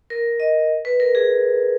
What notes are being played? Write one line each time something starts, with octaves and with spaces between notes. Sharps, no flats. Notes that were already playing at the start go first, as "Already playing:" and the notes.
A#4
D#5
B4
A#4
G#4